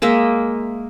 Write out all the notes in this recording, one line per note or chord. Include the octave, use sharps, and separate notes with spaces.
G#3 A#3 D#5 E5